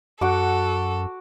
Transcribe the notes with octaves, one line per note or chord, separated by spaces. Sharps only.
F#2 F#4 A4 F#5 D6